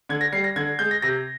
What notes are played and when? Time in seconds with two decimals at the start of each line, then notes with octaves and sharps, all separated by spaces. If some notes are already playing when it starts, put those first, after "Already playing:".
0.09 D3 G#6
0.21 A#6
0.33 G3 C7
0.44 A#6
0.56 D3 G#6
0.79 G#3 G6
0.91 A#6
1.02 C3 A#6